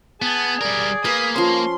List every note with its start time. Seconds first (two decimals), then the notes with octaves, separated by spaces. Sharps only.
0.22 B3 G#4 A5
0.61 G3 A#4 D5
1.05 A#3 B4 D#6 B6
1.36 F3 C#4 C6